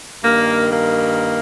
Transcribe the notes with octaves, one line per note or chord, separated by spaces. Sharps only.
G2 D#3 A#3
A#3